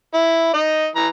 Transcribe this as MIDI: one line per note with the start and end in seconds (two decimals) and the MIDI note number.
0.14 0.52 64
0.54 0.87 63
0.54 0.87 75
0.96 1.07 52
0.96 1.07 82